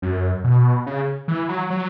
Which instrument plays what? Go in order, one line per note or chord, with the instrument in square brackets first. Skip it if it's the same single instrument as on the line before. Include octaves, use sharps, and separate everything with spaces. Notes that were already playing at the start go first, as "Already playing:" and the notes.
[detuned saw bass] F#2
B2
C#3
E3
F#3
F#3